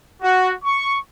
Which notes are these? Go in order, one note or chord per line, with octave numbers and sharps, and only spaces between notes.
F#4
C#6